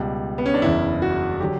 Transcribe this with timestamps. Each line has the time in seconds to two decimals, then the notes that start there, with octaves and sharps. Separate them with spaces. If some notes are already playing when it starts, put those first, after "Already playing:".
Already playing: C#2 B2 G3
0.38 B3
0.46 C#4
0.54 D4
0.62 F#1 E2 C#3 E4
1.02 F#4
1.40 D3 F#3 G4